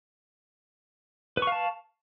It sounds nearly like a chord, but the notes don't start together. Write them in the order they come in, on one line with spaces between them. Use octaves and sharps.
B4 C#6 F5 A5